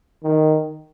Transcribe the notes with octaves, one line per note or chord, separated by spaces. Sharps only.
D#3